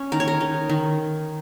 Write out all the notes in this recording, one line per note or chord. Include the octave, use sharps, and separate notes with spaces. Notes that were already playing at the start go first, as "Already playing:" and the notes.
Already playing: C#4
D#3 A#4
C#5
A#4
D#4
D#3